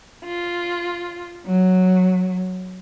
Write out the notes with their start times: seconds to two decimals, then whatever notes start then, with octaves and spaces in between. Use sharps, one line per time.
0.25 F4
1.45 F#3